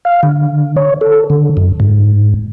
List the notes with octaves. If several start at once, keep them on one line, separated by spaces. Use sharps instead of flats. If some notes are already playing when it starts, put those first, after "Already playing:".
F5
D3
C#5
A4
D3
F#2
G#2